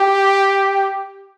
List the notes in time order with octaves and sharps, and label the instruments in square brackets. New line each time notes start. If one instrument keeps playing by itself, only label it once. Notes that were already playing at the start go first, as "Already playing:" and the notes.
Already playing: [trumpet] G4